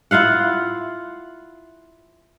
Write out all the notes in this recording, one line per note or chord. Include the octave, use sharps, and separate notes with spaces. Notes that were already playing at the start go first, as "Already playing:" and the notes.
E4 F4 F5 F#5